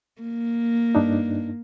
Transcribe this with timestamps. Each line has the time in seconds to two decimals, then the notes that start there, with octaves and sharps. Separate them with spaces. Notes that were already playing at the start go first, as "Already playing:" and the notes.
0.22 A#3
0.95 G2 D4 D#4